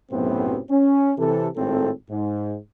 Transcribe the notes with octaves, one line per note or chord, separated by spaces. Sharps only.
B1 F#2 A2 C3 B3 C4
C#4
C3 E3 A4
G#1 A2 C4 A4
G#2